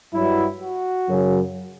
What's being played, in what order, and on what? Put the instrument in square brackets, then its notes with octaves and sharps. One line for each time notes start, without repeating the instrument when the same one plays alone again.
[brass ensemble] G2 F#3 E4
F#4
F#2 C#3 F#3